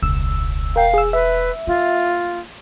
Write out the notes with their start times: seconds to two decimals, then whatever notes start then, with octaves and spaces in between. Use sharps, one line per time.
0.02 E1 C#2 E6
0.76 A#4 F5 G5
0.94 G#4 E6
1.13 B4 E5
1.67 A#3 F4